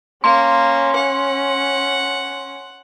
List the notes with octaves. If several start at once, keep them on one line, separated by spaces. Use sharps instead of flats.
A#3 C#4 C6
F#5